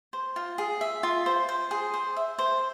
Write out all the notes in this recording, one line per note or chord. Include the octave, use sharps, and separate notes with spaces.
C5
F4
G#4
E5
F4
C5
C5
G#4
C5
E5
C5